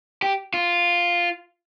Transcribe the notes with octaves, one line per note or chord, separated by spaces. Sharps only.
G4
F4